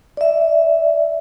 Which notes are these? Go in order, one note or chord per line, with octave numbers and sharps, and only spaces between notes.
D5 E5